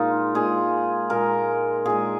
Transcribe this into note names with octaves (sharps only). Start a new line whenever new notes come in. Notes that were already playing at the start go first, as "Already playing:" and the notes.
Already playing: A#2 G#3 D#4 F4
A#2 G#3 G#4
A#2 G#3 A#4
A#2 G#3 G#4